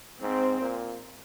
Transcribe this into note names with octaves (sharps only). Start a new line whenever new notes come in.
G#2 C4
A#2